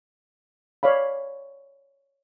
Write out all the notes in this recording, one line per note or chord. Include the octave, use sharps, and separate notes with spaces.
C#5 D5 F5 B5